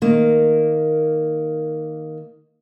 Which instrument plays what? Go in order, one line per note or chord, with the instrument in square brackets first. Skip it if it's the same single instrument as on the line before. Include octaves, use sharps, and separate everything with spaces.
[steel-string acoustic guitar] D#3 A#3